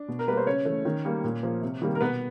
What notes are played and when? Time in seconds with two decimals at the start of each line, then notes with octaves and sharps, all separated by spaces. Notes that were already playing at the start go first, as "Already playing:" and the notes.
Already playing: D4
0.08 B2
0.19 A#4
0.27 G3 A#3 B4
0.37 C5
0.46 C#3 C#4 C#5
0.65 E3 A3
0.85 D#3
1.05 G3 A#3
1.24 A#2
1.43 F3 A#3
1.62 C3
1.82 D#3 G3 A#3
1.95 A#4
2.01 B2 B3 B4